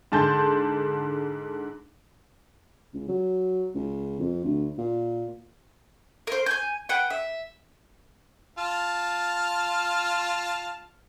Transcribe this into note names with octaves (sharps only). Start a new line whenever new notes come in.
G#2 D3 A5 C6 G6
C#2
F#3
C#2
F2
D2
A#2
A#4 C5
G#5 G6
B4 F#5 G5
E5
F4 A5 F6